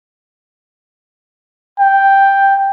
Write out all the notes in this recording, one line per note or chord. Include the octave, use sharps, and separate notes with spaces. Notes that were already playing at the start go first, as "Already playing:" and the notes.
G5